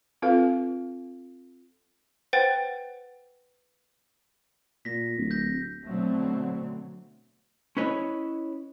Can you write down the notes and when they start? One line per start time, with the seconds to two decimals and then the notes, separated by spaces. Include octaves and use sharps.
0.22 C4 F4 A4 B4 F5
2.33 B4 C5 F#5 G5 A6
4.85 A#2 A#6 B6
5.17 D1
5.31 G6 A#6
5.86 B2 D3 F#3 A3 C4
7.77 C#4 E4 B4 C#5 D#5